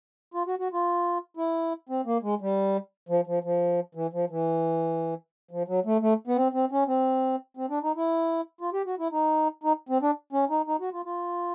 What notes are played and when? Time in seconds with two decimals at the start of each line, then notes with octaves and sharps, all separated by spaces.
0.34 F4
0.47 F#4
0.59 F#4
0.73 F4
1.37 E4
1.89 C4
2.06 A#3
2.23 G#3
2.41 G3
3.09 F3
3.27 F3
3.44 F3
3.95 E3
4.13 F3
4.30 E3
5.51 F3
5.68 F#3
5.85 A3
6.01 A3
6.27 B3
6.36 C4
6.53 C4
6.72 C#4
6.88 C4
7.57 C4
7.70 D4
7.83 D#4
7.96 E4
8.61 F4
8.73 G4
8.86 F#4
8.99 E4
9.12 D#4
9.64 D#4
9.89 C4
10.02 D4
10.33 C#4
10.50 D#4
10.67 D#4
10.80 F#4
10.93 F4
11.06 F4